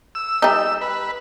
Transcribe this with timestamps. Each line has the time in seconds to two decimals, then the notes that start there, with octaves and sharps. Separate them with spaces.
0.15 E6
0.42 G3 D#4
0.81 B4